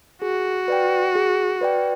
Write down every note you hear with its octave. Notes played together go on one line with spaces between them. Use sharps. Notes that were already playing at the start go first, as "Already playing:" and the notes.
F#4 G#4
B4 D5 G5
G#4
B4 D5 G5